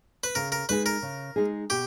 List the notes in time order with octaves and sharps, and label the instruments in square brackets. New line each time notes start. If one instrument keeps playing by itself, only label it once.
[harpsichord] B4
[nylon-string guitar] C#3 [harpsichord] A#4
[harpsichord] A#4
[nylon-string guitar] G#3 D#4 G#4 [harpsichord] B4
[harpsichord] A#4
[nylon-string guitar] C#3
G#3 D#4 G#4
[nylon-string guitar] B2 [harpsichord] G4